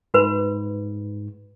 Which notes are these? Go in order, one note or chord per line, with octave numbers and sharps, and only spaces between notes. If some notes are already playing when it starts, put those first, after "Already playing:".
G#2 F#4 B4 B5